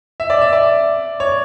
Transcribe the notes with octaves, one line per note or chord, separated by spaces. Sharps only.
E5
D5
E5
D5
C#5